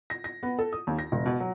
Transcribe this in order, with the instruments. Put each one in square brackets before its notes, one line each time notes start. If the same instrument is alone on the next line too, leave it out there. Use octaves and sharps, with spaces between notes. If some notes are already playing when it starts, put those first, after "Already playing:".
[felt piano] A#6
A#6
B3
A4
D#6
D#2
A#6
E1
B2
F#3